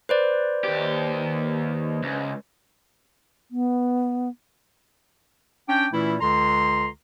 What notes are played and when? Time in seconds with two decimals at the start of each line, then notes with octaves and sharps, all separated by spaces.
0.09 B4 C5 D5
0.64 D#2 G4
2.03 C#2
3.51 B3
5.68 C#4 D4 G5
5.92 A#2 E3 A3 C#4 E4
6.21 C#2 D3 A#5 C6